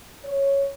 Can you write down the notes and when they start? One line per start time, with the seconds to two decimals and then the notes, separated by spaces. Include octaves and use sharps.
0.24 C#5